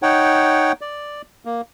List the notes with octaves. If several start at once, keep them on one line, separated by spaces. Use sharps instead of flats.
D#4 C#5 F#5 G5
D5
A#3